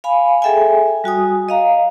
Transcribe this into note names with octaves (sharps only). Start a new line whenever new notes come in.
F5 G#5 B5
G#4 A4 E5 G5 G#5
G3 F#4 G#5 D#6
D#5 F5 A#5